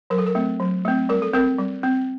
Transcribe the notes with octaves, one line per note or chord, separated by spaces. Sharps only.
F#3 A#4
A4
A#4
A3 C4
F#3
A3 C4
G3 A#4
A4
C4 A#4
G3
C4